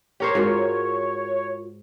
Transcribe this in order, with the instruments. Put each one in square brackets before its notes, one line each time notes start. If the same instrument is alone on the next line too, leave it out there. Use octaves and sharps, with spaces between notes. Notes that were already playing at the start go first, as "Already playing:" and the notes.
[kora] G4 A#4 C5 [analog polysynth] C#5
[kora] G#2 [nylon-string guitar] F4 F#4 A#4